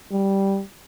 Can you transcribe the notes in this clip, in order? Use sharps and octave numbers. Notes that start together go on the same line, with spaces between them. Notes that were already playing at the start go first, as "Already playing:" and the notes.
G3